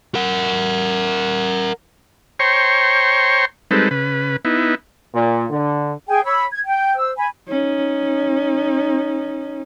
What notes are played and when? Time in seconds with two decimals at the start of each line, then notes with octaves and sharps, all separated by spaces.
0.15 A#4 F#5
2.39 C5 C#5 G5 A#5 C6 C#6
3.71 G3 G#3 C4 D#4 A4 B4
3.91 C#3 B4
4.45 B3 D#4 E4
5.14 A#2
5.50 D3
6.07 G#4 G5 G#5
6.24 C#5 B5 E6
6.51 G#6
6.66 G5
6.95 C5 E6
7.17 G#5 B5
7.48 C#4 D#4